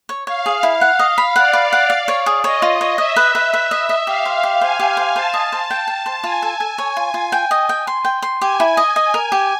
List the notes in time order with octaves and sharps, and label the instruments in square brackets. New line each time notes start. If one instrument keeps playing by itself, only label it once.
[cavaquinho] C#5
[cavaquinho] C#5 [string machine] F5
[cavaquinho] G#4
E4
[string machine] F5 [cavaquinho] F#5
[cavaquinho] D#5
B5
[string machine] D5 [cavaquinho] F#5
[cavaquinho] B4
F#5
F5
C#5
G#4
[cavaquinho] C#5 [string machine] D#5
[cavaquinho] F4
C#5
[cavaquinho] D#5 [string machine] E5
[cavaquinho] B4
B4
[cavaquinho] B4 [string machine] E5
[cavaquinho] D#5
D#5
[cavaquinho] G4 [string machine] F5
[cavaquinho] C5
G4
[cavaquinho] C5 [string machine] G#5
[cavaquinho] G4
C5
[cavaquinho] C5 [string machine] A5
[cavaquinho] D#5
C5
G5
G5
C5
[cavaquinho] F4 [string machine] G#5
[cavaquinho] A4
A4
C#5
F4
F4
G5
D#5
G5
C6
G5
C6
[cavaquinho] G4 [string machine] G#5
[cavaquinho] E4
D#5
[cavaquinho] D#5 [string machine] G#5
[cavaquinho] A#4
G4